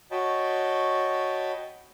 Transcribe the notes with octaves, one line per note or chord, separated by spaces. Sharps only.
F#4 C#5 D#5 G5 A5 B5